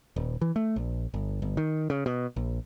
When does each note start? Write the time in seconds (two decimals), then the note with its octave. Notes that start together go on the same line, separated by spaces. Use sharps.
0.16 D#1
0.41 E3
0.56 A3
0.76 A#1
1.14 G1
1.42 G1
1.57 D#3
1.90 C#3
2.06 B2
2.36 A#1